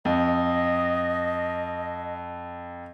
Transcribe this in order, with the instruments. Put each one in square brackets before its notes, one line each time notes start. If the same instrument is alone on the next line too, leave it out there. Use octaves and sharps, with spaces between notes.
[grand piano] F2 [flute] D#5